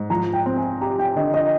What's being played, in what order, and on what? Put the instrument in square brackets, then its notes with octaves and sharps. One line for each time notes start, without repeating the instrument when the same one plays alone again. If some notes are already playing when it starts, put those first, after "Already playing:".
Already playing: [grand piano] G#2
[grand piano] F3 [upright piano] A#5
[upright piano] G5
[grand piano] C4
[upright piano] G#5
[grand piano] G4 [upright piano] A#5
[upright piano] G5
[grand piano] D3 [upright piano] D#5
[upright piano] D#5